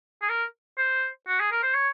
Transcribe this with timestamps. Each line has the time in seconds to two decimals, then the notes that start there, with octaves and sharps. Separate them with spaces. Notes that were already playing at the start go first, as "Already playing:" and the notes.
0.22 G#4
0.29 A#4
0.78 C5
1.28 F#4
1.40 G#4
1.52 A#4
1.63 C5
1.74 C#5